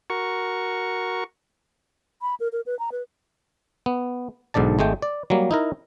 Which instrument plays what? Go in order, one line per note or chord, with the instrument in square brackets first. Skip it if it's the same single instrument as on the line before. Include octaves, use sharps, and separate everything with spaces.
[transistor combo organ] F#4 A#4 C#6
[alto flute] B5
A#4
A#4
B4
A#5
B4
[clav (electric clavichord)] B3
B1 G#2 D3 D5 A5
G#1 G#3 A3 G5
D5
F#3 G3 A#3
D#4 E4 A#4